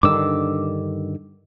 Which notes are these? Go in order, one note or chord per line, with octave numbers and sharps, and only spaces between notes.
G2 D3 D#3 D6 E6